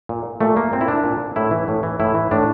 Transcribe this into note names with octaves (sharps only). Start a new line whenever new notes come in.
A#2
A#2 A3
A#3
A#2 C4
E4
D4
A#2
A2 E4
E3
A2
E3
A2 E4
E3
A2 D4